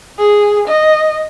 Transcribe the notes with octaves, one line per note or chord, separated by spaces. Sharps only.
G#4
D#5